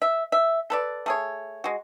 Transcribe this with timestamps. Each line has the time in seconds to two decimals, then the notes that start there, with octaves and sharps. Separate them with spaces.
0.02 E5
0.32 E5
0.70 A4 B4 D5
1.06 A3 G#4 C#5
1.64 G#3 F#4